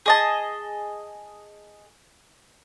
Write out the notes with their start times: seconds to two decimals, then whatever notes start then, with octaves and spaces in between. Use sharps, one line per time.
0.06 G#4 D#5 A5